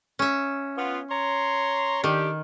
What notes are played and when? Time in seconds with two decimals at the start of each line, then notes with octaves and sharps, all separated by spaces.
0.19 C#4 E5
0.77 B3 F4
1.11 C#5 A#5 C6
2.04 D#3 D4 G4